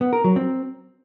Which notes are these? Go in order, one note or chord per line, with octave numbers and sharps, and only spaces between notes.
B3
A#4
F#3
C4